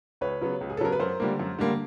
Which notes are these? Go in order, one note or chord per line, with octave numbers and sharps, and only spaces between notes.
C#2 B4 C#5
C#3 F#3 B3
C#2
G#4
A4
C#3 F#3 B3 A#4
B4
F#2 A#4 C5
D3 G3 A#3
F#2
D3 G3 A#3